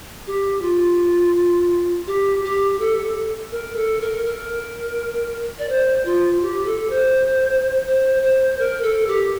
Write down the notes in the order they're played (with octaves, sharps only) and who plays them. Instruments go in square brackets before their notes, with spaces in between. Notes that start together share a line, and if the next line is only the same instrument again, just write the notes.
[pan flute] G4
F4
G4
G4
A4
A#4
A4
A#4
A#4
D5
C5
F4
G4
A4
C5
C5
C5
A#4
A4
G4